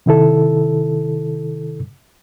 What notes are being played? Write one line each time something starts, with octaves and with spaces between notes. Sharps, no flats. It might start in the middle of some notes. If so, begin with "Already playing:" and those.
C3 D#3 E4 A4